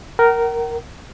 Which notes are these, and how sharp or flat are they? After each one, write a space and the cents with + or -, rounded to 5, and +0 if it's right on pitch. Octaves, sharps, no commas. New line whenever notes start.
A#4 +0 F#5 +45